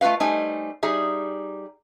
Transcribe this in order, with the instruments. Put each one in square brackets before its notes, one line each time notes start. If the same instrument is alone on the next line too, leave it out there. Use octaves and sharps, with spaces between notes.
[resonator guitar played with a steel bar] A3 F4 F#4 B4 F5
G3 A3 D#4 C5 G#5
G3 D#4 G#4 E5